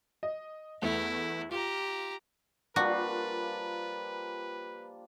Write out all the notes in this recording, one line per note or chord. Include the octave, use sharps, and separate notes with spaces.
D#5
E2 A3 E4
F4 G4 A#5
F3 G3 A#3 D4 F4 F#4 B4